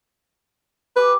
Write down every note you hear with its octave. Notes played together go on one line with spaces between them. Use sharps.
G4 B4 G#5 D6